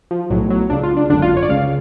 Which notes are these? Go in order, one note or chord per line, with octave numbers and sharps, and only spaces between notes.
F3
B1 A2 F#3
F#3
C#2 C#3 D4
F4
D4
G#1 F#2 D3 D4
F4
C#5
D5
C#2 C#3 F5